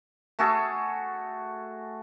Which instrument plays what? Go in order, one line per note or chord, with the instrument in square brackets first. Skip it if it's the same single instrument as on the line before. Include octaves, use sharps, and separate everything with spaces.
[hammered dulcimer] A3 F#4 G#4 A4